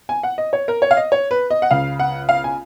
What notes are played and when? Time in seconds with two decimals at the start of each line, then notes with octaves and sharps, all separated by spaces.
0.09 G#5
0.23 F#5
0.38 D#5
0.53 C#5
0.68 A#4
0.82 C#5
0.91 F5
0.97 D#5
1.12 C#5
1.31 B4
1.50 D#5
1.62 F#5
1.71 C#2 C#3 F5
1.99 F#5
2.29 F5
2.44 G#5